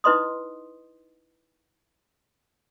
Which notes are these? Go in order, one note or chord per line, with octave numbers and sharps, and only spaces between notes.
D#4 E4 B4 D#5 C6 D#6